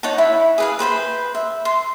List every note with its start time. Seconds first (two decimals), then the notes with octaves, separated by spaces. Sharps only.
0.03 D#4 C#5 F#5 A5
0.18 E4 E5 B5
0.58 G#4 B4 F5
0.79 B4 C5 G5 B5
1.35 E5
1.65 C6